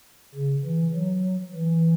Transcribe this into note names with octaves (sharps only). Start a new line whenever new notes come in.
C#3
E3
F#3
E3